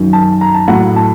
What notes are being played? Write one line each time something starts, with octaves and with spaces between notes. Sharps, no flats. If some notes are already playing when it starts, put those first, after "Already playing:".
Already playing: F#2 D#3 F#3
A5
A#5
A5
A2 F#3 F#5
A5